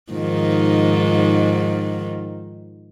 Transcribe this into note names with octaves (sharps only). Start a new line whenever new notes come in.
G#2 D#3 F3